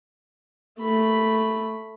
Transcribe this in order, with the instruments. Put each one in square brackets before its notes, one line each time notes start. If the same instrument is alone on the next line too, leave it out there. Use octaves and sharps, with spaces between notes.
[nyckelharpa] A3 B5